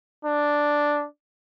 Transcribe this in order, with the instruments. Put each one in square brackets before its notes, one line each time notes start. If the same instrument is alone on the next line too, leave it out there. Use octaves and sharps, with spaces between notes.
[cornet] D4